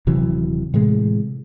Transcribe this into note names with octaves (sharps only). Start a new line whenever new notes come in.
D#1 C3 E3 F#3
A2 C3 E3 G#3